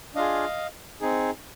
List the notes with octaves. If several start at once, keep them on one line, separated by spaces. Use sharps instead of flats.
D4 F4 G#4 D#5 F5
C4 D#4 G#4